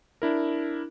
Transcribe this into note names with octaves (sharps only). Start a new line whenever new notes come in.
D4 E4 A#4